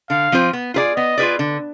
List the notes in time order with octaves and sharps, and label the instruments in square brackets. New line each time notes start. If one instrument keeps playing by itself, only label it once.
[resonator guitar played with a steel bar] D3 [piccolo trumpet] F5
[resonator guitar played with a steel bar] F3 C4 F4 C5
B3
F4 G#4 B4 D5
[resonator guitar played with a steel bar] B3 [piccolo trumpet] D#5
[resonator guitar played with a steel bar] F4 G#4 B4 D5
D3